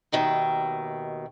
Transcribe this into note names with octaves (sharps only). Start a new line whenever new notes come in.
D#2 B2 D#3 E5